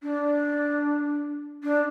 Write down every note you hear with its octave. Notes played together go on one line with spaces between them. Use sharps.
D4
D4